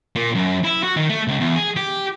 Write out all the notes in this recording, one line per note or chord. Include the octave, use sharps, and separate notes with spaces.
A#2
F#2
E4
F#4
D#3
A3
C#2
E2
G#4
G4